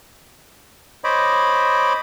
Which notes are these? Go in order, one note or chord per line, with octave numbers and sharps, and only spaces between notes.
C5 C#5 D#5 B5 D6